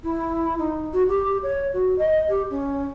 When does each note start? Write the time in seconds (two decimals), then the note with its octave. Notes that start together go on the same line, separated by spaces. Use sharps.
0.03 E4
0.58 D#4
0.93 F#4
1.08 G4
1.43 C#5
1.73 F#4
1.98 D#5
2.29 G4
2.50 C#4